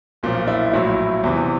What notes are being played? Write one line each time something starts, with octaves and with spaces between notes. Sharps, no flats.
B1 A#2 F3
E4
A#1 A2 F#3 E4
E2 C3 E3